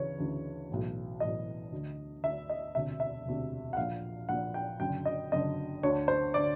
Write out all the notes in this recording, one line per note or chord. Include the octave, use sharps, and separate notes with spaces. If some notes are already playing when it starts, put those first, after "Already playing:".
Already playing: D2 C#3 E3 C#5
D2 C#3 E3
B1 A2 E3
B1 A2 E3 D#5
D2 D3
D2 D3 E5
D#5
E1 D2 C3 E5
E5
E1 D2 C3
F#5
A#1 A#2 F5
A#1 A#2 F#5
G5
F#1 F#2 D3 G5
D#5
F#1 F#2 D3 D#5
D2 D3 C#5
C5
D3 D5